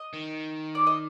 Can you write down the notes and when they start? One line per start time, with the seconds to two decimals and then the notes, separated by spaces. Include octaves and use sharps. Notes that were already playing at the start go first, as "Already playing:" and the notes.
Already playing: D#5
0.13 D#3
0.75 D5
0.87 D#5